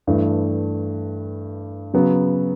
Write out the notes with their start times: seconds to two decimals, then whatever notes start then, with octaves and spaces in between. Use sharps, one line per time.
0.07 G2 E3 A3
1.94 C#3 F#3 B3